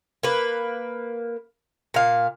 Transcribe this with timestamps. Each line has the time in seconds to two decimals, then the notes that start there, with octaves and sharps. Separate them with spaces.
0.23 A#3 B4
1.94 A#2 F5